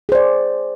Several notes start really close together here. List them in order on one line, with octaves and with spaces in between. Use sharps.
G#4 C5 D5